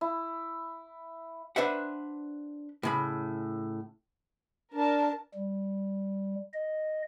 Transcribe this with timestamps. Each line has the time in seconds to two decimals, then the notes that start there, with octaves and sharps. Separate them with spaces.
0.01 E4
1.56 D4 B4 C5 E5 F#5
2.83 A2 C#3 B5
4.74 D4 A#4 A5
5.34 G3
6.54 D#5